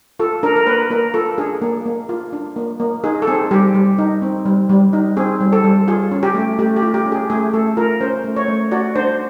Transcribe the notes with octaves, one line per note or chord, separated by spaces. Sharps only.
F4 A4
D4 A#4
A#4
A#3 B4
A#3 A#4
F4 A4
D4 G#4
A#3
A#3
F4
D4
A#3
A#3
D#4 G#4
A4
C4 G#4
G3 G4
G3
D#4
C4
G3
G3
D#4
C4 G#4
G3
A4
G3
F4 G#4
C#4
G4
A3
A3 G4
G4
F4
G4
C#4
G#4
A3 G#4
A3 A4
F4 A#4
C#4 C5
A3
C#5
A3
F#4 D5
D4 C5